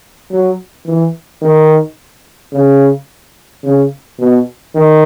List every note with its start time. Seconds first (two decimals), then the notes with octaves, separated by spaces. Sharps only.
0.31 F#3
0.86 E3
1.41 D#3
2.52 C#3
3.64 C#3
4.19 B2
4.75 D#3